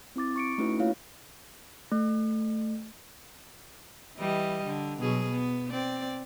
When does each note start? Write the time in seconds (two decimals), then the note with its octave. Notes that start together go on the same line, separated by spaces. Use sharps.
0.16 C4 E4 D6 A6
0.36 C#6 C#7 D7
0.58 A3 C#4 D#4 E4 F#4 B4
0.79 A3 A#3 E4 F4 C#5 F5
1.92 A3
4.17 E3 G3 D#5
4.66 D3
5.00 B2 F#3 G#4
5.31 B3
5.71 C4 D5